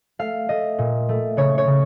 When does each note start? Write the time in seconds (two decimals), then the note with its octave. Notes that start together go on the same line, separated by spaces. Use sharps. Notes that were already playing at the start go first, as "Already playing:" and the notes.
0.19 A3 F5
0.49 A3 D#5
0.78 A#2
1.09 A3
1.37 C#3 C#5
1.58 C#5
1.67 C#3